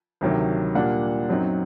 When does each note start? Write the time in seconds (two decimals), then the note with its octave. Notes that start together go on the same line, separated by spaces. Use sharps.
0.21 D2 C3 D#3 F#3
0.75 A#2 G3 A#3 D4 F#5
1.29 F#2 F#3 C4 D#4